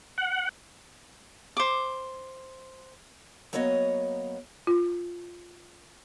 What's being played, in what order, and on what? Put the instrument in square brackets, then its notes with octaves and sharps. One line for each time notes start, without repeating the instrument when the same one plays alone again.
[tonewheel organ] F#5
[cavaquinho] C5 D6
[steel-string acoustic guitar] F#3 A#3 B3 C#5 D#5
[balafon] F4